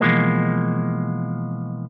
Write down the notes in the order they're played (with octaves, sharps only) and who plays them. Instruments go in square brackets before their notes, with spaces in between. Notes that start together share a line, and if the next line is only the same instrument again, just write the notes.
[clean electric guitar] B2 E3 F3 G#3 A#3